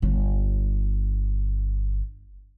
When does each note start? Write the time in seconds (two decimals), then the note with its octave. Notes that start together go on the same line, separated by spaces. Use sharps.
0.02 G1 D3